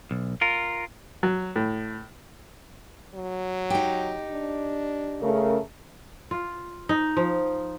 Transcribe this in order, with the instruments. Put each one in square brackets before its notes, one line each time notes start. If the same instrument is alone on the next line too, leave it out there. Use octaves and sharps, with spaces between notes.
[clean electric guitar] B1
F4 A#4
[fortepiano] F#3
A2
[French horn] F#3
[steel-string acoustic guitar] D#4 G4
[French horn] D4
[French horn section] C#3 A3 A#4
[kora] F4
D#4
F3